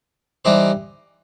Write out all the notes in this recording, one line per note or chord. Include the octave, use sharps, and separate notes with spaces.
E3 G3 D#4 G4 C5